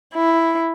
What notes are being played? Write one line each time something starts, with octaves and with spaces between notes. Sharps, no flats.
E4